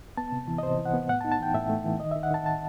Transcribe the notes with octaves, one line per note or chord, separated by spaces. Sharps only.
B3 A5
C3
E3
D#5
C3 C5
E3
F#5
B3
A2 F#5
A5
D#4
A5
E3 G5
A2 E5
A3
E3
D#3 D#5
D#3 E5
F#5
D#3 A5
A5